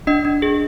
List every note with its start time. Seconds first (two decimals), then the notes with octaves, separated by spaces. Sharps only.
0.07 D4 D#5
0.25 D4
0.42 G#4